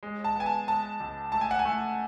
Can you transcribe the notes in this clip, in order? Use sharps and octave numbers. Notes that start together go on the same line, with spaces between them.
G#3
A5
B3 G#5
A5
G#3 A5
C#2
A3 A5
G#5
F#5
G#5
A3